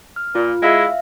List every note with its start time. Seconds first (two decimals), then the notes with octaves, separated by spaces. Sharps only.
0.16 F6
0.35 A#2 F4
0.63 G#3 E4 E5 F5